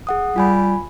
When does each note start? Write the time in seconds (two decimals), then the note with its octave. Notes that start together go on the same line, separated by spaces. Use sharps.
0.07 G#4 F#5 D#6
0.36 G3 F4 G#5 B5